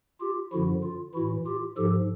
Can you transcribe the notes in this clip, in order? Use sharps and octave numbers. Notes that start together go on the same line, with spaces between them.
F4 G4
F#2 D3 F3 E4 F#4
F4
A2 E3 E4 F#4
F4 G4
G#2 F3 G4 A4